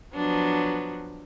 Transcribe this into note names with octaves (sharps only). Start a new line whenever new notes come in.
F3 F#3 B3 D4